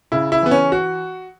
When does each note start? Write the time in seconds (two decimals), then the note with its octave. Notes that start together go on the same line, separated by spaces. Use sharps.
0.12 C#3 E4
0.32 E4
0.42 E3 B3
0.51 C#4
0.72 F#4